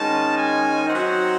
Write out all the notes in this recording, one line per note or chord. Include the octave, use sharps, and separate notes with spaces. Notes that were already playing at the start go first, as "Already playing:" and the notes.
Already playing: D#3 G#3 C#4 A5
G#5
F#3 C4 D#4 F#5